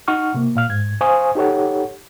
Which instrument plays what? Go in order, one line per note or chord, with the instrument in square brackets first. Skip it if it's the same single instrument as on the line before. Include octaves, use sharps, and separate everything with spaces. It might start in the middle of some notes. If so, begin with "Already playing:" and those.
[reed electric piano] D#4 F#5 C#6 F6
C3 A#3
A#2 F5 F6
G#2 G#6
C5 F5 G#5 C#6 D#6
D#4 G4 A4 C#5 F#5